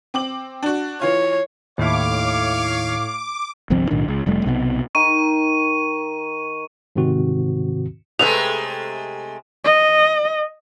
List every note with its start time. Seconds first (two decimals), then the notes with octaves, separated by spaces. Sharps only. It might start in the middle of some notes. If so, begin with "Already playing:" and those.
0.14 C4 D6 F#7
0.63 D4 F#4
1.02 E3 F4 C#5
1.78 D#2 A2 E4 C#5 F5 D6
3.70 G1 C2 F3 C4
3.90 B1 A2 D#3 D4
4.08 C#2
4.26 F1 G3 A3
4.45 B1 C3 F3 B3
4.95 D#3 D#4 C#6 D#7
6.96 G#2 C3 D#3 C4 F#4
8.19 C3 G#3 A3 G#4 A4 B4 F7
9.65 D#5